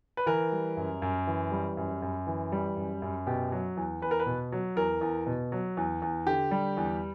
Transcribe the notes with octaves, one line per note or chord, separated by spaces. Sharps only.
B4
E3 A#4
G3
F#2
F#2
E3
G3
F#2
F#2
E3
G3
F#2
F#2
B2 G4
F#3
E2
E2 B4
A#4
B4
B2
F#3
E2 A#4
E2
B2
F#3
E2
E2
D3 G4
G3
E2